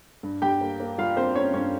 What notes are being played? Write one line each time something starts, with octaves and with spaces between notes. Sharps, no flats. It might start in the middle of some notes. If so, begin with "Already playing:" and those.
G2
G2 G4 G5
A#3
A#3
G3 F4 F5
A#3 C4 C5
A#3 C#4 C#5
G2 C#4 C#5